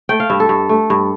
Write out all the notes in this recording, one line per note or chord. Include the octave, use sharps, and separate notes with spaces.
A3 G5
F5
G2 E5
A4
G2
A3
G2